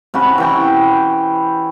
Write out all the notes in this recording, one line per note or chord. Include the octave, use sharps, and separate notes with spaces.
C3 C#4 F#4 B5
E3 G5 C#6